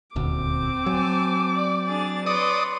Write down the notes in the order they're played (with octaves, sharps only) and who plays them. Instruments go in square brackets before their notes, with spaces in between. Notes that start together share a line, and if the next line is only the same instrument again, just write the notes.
[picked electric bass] D#1 D2 [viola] C4 D6
[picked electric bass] F#3 [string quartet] G#5 A5
[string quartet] D5
D4 G#4 A6
[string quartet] B4 C#5 C6 [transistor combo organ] D5 D#6